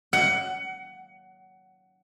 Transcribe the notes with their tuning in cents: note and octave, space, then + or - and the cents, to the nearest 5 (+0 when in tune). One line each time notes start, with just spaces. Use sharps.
F#5 +20